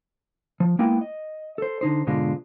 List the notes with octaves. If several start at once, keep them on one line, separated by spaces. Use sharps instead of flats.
F3
G#3 A#3 B3 E4 G5
D#5
A4 C5
D3 D#4 C5
G#2 B2 D3 G#3 D4 F4